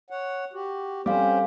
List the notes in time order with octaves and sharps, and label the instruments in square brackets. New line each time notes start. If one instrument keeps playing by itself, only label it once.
[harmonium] C#5 F#5
F#4 G4
[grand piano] G3 [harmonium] C4 C#4 C5 [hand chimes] A4 F5 D6